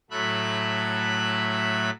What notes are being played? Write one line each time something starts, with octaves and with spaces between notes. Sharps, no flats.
A2 F#3 A3 E5 B5 F#6